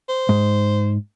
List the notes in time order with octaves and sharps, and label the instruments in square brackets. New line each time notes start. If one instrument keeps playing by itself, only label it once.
[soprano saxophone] C5
[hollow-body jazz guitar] G#2